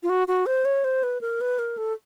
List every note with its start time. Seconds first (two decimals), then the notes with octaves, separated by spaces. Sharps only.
0.03 F4
0.09 F#4
0.28 F#4
0.46 C5
0.65 C#5
0.84 C5
1.03 B4
1.21 A#4
1.41 B4
1.59 A#4
1.77 A4